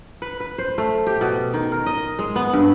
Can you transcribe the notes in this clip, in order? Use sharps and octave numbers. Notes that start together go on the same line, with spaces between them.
B4
B4
C5
A3
G4
B2
D#3
A#4
D#5
G#3
B3
G2